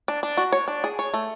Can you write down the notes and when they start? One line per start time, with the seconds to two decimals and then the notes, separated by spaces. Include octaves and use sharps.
0.08 D4
0.23 D4
0.37 F#4
0.52 C#5
0.68 D4
0.84 G#4
0.99 C#5
1.14 A3